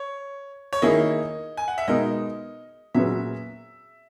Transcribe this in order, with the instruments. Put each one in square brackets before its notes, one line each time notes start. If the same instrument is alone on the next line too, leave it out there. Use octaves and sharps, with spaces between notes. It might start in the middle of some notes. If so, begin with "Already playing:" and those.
Already playing: [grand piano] C#5
C#5
[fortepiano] D#3 A#3 E4 G#4 [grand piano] D#5
[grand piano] G#5
F#5
E5
[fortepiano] B2 G#3 D#4 A#4 [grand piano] D#5
[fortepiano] A#2 F#3 C#4 G#4 B4 [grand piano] E5